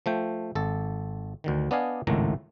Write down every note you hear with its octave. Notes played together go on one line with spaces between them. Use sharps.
F3 A3 G5
G#1 A4
D2 D3 D#3
B3 D4 D5 D#5 F5 G#5
G#1 C#2 A2 D#3 A3 A#5